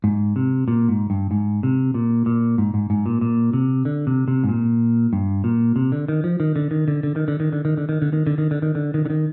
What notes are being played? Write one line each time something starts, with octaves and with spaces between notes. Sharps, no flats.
G#2
C3
A#2
G#2
G2
G#2
C3
A#2
A#2
G#2
G#2
G#2
A#2
A#2
C3
D3
C3
C3
G#2
A#2
G2
A#2
C3
D3
D#3
F3
D#3
D3
D#3
D3
D3
D#3
D3
D#3
D3
D#3
D3
D#3
D3
D#3
D3
D#3
D3
D#3
D3
D#3
D3
D#3